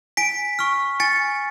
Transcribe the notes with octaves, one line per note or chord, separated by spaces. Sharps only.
G#5 B6 D7
C#6 F6
G#5 A6 C#7